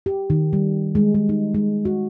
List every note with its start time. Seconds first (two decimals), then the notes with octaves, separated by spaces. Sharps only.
0.06 G4
0.30 D#3
0.53 G3
0.95 G#3
1.15 G#3
1.29 D#4
1.54 G#3
1.85 F#4